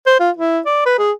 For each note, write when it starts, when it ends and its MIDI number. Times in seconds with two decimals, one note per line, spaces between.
0.07 0.15 72
0.20 0.30 65
0.37 0.60 64
0.66 0.81 74
0.86 0.94 71
0.99 1.12 68